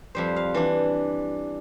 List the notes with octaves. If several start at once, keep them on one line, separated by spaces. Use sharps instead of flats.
F2 G3 C5
F5
E3 D4